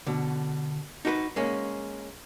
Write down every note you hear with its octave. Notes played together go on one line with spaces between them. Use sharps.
B2 D3
D#4 F#4 A#4 B4
G#3 A#3 C#4